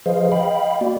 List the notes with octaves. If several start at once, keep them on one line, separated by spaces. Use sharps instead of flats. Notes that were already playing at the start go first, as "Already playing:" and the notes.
F3 G#4 B4 C5 D#5 F5
D#5 F5 G5 B5
A#3 F#4 D5